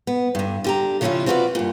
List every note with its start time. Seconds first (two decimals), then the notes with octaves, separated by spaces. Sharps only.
0.07 B3
0.35 G2 D3
0.64 D3 G4 A#5
1.01 C#3 F3 C#4 D4 E4 F4
1.26 C4 F4 F#4 G#4 B4 D5
1.55 G2 A#2